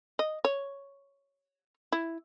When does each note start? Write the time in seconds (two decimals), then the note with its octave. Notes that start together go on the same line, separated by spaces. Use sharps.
0.19 D#5
0.45 C#5
1.92 E4